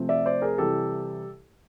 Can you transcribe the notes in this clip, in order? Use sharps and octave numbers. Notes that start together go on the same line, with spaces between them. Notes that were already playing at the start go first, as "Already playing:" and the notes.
Already playing: C3 F3 A3 C4
D5 E5
C5 D5
G#4 A#4
C3 E3 G3 G4 A4